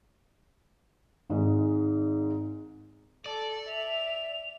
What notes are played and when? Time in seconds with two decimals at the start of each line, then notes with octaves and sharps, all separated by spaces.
1.30 G#1 G#2 G#3
3.26 A4 D5
3.68 E5 F7